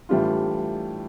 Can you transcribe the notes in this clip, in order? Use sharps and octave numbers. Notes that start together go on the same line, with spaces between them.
A2 E3 G3 D4 F4